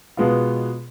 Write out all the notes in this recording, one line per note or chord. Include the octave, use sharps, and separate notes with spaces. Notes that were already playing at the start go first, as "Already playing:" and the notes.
B2 G#3 B3 F4